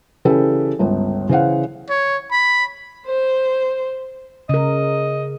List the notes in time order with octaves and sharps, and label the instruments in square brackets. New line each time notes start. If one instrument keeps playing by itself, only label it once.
[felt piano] C#3 E3 C#4 G4 A4 B4
G1 C#2 B3
C#3 E3 C5 F5 F#5
[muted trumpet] C#5
B5
[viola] C5
[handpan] C#3 A#4 [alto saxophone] D#5